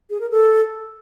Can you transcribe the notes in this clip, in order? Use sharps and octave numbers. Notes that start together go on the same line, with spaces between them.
G#4
A#4
A4